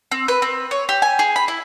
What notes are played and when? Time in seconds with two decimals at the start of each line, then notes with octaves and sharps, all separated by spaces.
0.12 C4
0.28 B4
0.42 C4
0.71 C#5
0.89 G4
1.02 G#5
1.19 G#4
1.36 B5
1.48 E4